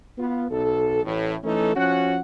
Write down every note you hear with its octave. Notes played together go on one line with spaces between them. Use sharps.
B3 F4
B1 A4
A1 A2
E3 A3 C#4 D#4 A4
F3 C#4 F#4 F#5